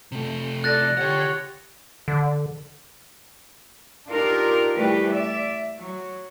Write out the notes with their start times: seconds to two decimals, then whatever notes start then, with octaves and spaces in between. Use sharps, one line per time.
0.12 C3 A3
0.64 A4 D5 F#6 A6 A#6
0.97 D3 G4 C#5 F#5
2.08 D3
4.07 D4 D#4 F4 G4 A#4
4.75 E3 G3 A3 G4 B4
5.10 D5 E5
5.79 F#3